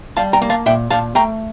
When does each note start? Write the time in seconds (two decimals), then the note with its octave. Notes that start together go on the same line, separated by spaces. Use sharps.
0.17 G3 F5 A5
0.33 G5 A#5
0.42 A#3
0.50 F5 A5
0.66 A#2 E5 G5
0.91 A#2 F5 A5
1.15 A3 G5 A#5